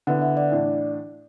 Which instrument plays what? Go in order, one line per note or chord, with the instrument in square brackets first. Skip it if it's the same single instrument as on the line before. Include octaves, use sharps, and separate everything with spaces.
[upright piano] D3 B3 E4 [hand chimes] F#5
[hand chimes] E5
D5
[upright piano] A2 E3 D4